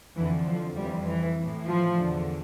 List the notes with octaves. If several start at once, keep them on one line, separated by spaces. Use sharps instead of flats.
F2 D3 E3
F3
F2 E3 G3
E3
A2 E3
F3
E2 D3